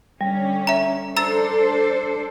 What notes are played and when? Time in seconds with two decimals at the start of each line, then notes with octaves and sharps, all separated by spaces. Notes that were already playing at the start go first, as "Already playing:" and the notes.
0.21 D3 G3 C#4
0.67 E5 A#5
1.17 D4 A4 C5 A#5 E6 A6